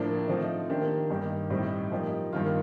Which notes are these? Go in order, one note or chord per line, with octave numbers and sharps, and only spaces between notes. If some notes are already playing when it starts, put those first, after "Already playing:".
Already playing: A2 F3 A#3 D4
F3 A3 C4 D#4
D#3 A#3 D4 G4
G2 D#3 A#3 D#4 G4
A2 G3 C4 D#4
F3 A#3 D#4 G4
G2 D#3 A#3 F4